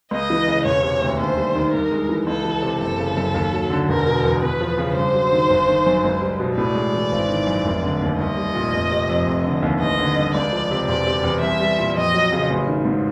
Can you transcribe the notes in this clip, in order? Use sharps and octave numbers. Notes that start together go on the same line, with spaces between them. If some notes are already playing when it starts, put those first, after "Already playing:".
C#2 D#5
E3
C#3
E1 C#5
C3
D2
D#2 C5
G3
D#3
G2 A#4
G#3
E3
C#2 A4
E3
C3
F#1 A4
C#3
F#2
D#2
F#3
D3
E1 A#4
B2
E2
E2 B4
F3
C#3
G2 C5
F#3
D#3
G1
D#3
F#2
C#2
G3
B2
A2 D5
G#3
E3
G#1
D#3
F#2
F1
D3
D#2
C2 D#5
G3
A#2
F1
C3
F2
F1
D3
D#2
A1 D#5
D3
G2
C#2 D5
F3
C3
E1 D5
C3
E2
C2 E5
G3
A#2
F2 D#5
F#3
C#3
A1
D#3
G#2